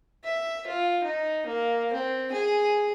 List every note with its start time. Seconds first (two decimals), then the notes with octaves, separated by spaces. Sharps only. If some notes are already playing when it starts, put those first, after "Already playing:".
0.24 E5
0.67 F4
1.03 D#4
1.46 A#3
1.93 C4
2.32 G#4